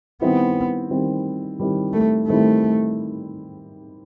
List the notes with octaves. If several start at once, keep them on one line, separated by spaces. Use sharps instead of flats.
D#3 G3 B3 C4 E4
D#3 G3 C4 E4
D#3 G3 C4 E4
A3
D#3 G3 A3 C4 E4